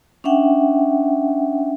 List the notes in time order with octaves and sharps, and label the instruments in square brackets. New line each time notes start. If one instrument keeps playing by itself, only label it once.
[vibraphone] C#4 D4 E5 F#5 G5